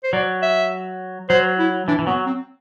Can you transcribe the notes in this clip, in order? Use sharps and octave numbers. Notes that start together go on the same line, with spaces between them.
C5
F#3 D5
E5
F#3 C5
E4
E3 D4
E3
F#3 B3
C4